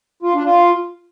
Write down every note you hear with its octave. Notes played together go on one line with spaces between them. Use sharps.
F4
D4
F4